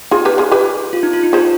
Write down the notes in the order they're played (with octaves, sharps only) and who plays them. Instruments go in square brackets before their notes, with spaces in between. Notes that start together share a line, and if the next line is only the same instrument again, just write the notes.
[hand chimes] D#4 [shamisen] F4 G#4
[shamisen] G4 B4
F4 G#4
G4 B4
[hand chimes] F4
D#4
F4
D#4
[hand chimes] F4 [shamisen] G#4 C5